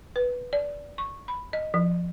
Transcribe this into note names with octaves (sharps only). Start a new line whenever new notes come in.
B4
D5
C#6
B5
D#5
F3